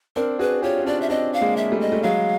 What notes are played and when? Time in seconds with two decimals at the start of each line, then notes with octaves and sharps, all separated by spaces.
0.16 C4 D4 A#4
0.39 F#4 G#4 B4
0.62 F4 G4 C#5
0.79 C#4
0.86 C4 D4 D5
1.01 E5
1.10 C4 D4 D#5
1.33 F5
1.41 G#3 A#3
1.57 E5
1.72 G3 A3
1.80 D#5
1.92 A3
2.03 F#3 G#3 F5